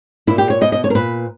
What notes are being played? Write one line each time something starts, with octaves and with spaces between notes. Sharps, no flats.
A#2 E4
G4
C#5
B2 D#5
D#5
C#5
A#4
A#2 B4